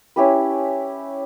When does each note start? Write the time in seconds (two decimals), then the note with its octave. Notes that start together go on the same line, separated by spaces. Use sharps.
0.16 C#4 E4 G4 B4